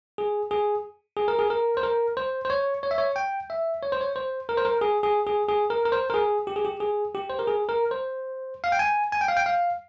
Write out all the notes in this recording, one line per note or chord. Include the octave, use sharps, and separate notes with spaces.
G#4
G#4
G#4
A#4
G#4
A#4
C5
A#4
C5
C5
C#5
C#5
E5
C#5
G5
E5
C#5
C5
C#5
C5
A#4
C5
A#4
G#4
G#4
G#4
G#4
A#4
A#4
C5
A#4
G#4
G4
G#4
G4
G#4
G4
C5
A#4
G#4
A#4
C5
F5
G5
G#5
G#5
G5
F5
G5
F5